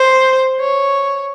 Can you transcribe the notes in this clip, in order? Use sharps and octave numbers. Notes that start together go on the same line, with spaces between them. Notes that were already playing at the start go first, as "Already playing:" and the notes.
Already playing: C5
C#5